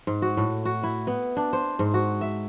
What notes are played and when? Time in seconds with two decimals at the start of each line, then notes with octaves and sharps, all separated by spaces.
0.07 G#2
0.22 F#4
0.37 A2
0.65 F#4
0.83 E4
1.07 B3
1.37 D4
1.53 C5
1.79 G#2
1.94 F#4
2.21 E5